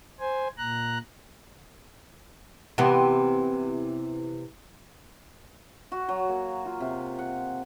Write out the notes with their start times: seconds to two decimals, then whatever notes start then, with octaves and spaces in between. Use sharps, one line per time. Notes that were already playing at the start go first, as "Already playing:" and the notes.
0.20 C5 G#5
0.58 A#2 A#5 F#6
2.78 C3 E3 B3
5.92 F#4
6.09 F#3
6.29 A#3
6.66 F4
6.80 C3
7.19 F#5